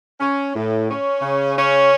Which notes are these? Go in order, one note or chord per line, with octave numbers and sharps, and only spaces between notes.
C#4
A2
C#4
C#3
C#4